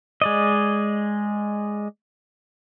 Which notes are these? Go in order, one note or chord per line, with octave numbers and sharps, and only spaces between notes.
G#3 D5 D#5